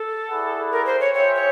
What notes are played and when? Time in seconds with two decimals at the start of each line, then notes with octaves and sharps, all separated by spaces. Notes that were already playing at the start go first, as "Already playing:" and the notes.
Already playing: A4
0.29 E4 G#4 B4 D5 F#5
0.72 A#4
0.86 C5
1.00 C#5
1.14 F4 G#4 C5 C#5 E5 G5
1.35 C#5